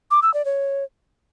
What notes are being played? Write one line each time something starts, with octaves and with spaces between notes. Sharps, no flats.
D6
E6
D5
C#5